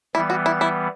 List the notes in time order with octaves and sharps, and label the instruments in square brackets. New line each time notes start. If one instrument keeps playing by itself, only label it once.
[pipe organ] E3 G3 B3 [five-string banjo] E4
[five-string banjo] F#4
E4
E4